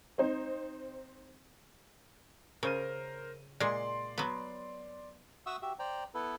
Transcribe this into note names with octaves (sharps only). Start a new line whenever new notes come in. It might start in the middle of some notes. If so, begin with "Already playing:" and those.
C4 D#4 C5
C#3 A#4 C5 D#7
A#2 G#3 D5 C6
F#3 B3
F#4 E5 F#5 C#6 D#6 E6
F#4 G4 E5
C5 D5 G5 A#5
B3 E4 A4 B4